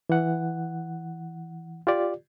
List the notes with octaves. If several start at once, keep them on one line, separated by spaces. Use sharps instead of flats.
E3 F#5
F4 G4 D5